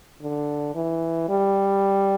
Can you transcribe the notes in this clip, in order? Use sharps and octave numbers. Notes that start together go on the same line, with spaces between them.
D3
E3
G3